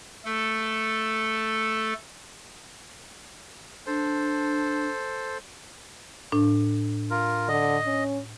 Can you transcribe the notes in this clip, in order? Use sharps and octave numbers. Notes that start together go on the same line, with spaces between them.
A3 A4
D4 A4 C5
A2 D4
F4 A#4
D3 D#5
C#4